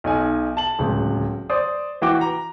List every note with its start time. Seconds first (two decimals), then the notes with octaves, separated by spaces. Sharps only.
0.04 B1 D#4 G#5
0.57 A5 F#7
0.79 D1 C#2
1.50 C5 D5 D#6
2.02 E3 F#4 G5 D6
2.21 A#5